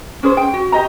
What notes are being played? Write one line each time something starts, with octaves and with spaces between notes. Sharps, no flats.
C#4 G#4 C5
G5
F#4
G4 D#5 A#5